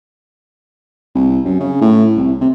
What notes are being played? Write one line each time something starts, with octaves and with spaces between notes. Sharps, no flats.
C2
F#2
C#3
A2
C2
C3